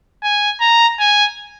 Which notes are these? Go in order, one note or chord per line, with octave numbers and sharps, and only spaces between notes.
G#5
A#5
G#5